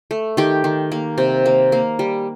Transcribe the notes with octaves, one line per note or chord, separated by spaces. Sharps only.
A3
D#3 G4
D#3
A#3
C3
A#3
A#3
G3